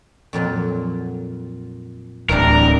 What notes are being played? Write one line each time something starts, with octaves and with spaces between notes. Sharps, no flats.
F2 A#2 F#3
D1 E3 G3 D4 A#4